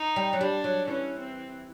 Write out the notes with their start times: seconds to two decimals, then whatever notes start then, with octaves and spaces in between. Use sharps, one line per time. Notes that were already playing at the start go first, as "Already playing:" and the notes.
Already playing: D#4
0.16 G3
0.33 F#3
0.41 G3 D4
0.64 F#3
0.87 E3 C#4
1.19 C4